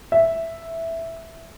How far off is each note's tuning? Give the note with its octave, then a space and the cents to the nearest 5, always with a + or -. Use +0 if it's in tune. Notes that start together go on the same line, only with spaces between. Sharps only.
E5 +0